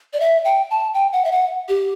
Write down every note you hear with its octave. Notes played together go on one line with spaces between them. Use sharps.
D5
E5
G5
A5
G5
F#5
E5
F#5
G4